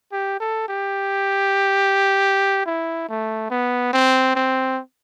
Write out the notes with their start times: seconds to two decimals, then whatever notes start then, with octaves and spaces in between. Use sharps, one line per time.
0.12 G4
0.40 A4
0.68 G4
2.66 E4
3.08 A3
3.50 B3
3.93 C4
4.35 C4